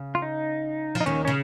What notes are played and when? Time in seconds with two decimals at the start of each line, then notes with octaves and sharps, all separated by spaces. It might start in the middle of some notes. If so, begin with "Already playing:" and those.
Already playing: C#3
0.15 F4
0.22 D#4
0.95 F3
1.01 D#4
1.06 D#2 D#3 C#4
1.25 C#3 C#4